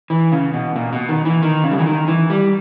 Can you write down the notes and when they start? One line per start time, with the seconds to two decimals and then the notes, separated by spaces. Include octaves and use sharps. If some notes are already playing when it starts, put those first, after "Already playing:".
0.10 E3
0.32 C#3
0.54 B2
0.76 A#2
0.93 B2
1.09 D#3
1.25 E3
1.42 D#3
1.64 C#3
1.71 G3
1.78 E3
1.86 D#3
2.08 E3
2.30 G3